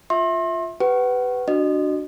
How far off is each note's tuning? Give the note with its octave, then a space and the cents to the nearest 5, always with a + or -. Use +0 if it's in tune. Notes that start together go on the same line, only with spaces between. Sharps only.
F4 +0 E5 -10 C6 +35
G4 +0 B4 +15 F#5 +30
D4 +10 F#4 +0 D#5 -30